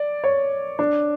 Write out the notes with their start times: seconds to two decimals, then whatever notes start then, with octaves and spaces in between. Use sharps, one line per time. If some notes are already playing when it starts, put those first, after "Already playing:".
Already playing: D5
0.24 C#5
0.79 D4